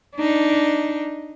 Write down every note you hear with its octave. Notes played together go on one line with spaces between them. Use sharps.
D4 D#4